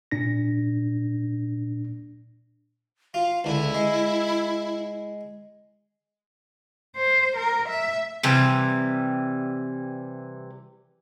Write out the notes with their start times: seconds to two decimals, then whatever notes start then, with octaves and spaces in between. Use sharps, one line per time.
0.11 A#2 D4 A#6
3.14 F4 F5
3.44 C#2 D3 E4
3.75 G#3
6.96 C5
7.36 A#4
7.68 E5
8.23 C3 E3 G3